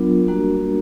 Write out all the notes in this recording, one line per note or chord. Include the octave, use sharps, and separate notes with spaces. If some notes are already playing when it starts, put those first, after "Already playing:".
Already playing: F#3 B3 D4 F4 A#4
G3 A#3 D4 F#4